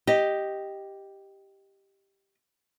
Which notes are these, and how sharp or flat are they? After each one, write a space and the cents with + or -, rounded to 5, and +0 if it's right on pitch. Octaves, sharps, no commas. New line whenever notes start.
G4 +0 D#5 +0